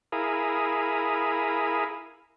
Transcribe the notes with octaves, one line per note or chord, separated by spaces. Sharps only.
E4 G#4 A#4 F5 B5 D#6